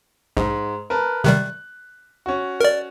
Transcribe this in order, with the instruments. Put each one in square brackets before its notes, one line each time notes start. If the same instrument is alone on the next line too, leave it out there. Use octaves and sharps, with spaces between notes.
[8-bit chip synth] A#1 [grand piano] G#2
[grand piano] A#4 B4 A5
[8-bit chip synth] C3 D#3 G3 [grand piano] F#6
[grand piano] C#4 F#4
[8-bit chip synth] A#4 D5